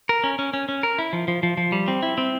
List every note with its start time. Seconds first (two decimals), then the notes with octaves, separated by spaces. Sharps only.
0.09 A#4
0.24 C#4
0.39 C#4
0.54 C#4
0.69 C#4
0.83 A#4
0.99 E4
1.13 F3
1.28 F3
1.43 F3
1.57 F3
1.72 G3
1.88 C4
2.03 E4
2.18 C4